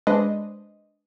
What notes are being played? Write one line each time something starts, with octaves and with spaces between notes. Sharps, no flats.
G#3 D4 B4 C5 D#5